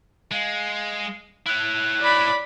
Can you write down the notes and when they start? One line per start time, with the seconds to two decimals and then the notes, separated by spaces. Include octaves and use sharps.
0.31 G#3 F5
1.46 E4 C#5 F#6
2.02 D5 B5